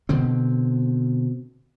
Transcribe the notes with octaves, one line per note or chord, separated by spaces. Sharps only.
B2 D3 C4